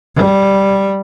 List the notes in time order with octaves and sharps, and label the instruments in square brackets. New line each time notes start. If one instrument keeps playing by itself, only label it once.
[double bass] G3